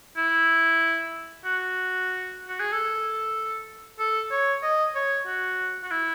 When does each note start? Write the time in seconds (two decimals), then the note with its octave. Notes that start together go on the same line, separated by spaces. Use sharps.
0.17 E4
1.45 F#4
2.48 F#4
2.60 G#4
2.72 A4
3.99 A4
4.31 C#5
4.63 D#5
4.95 C#5
5.26 F#4
5.83 F#4
5.91 E4